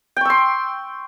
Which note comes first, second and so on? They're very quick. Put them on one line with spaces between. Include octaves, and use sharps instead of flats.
G5 C#6 E6 C6